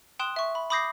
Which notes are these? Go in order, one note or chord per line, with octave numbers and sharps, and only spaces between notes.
G5 C6 D#6 F#6 E7
E5 C#6
B5
B5 D6 D#6 G6 A#6 C7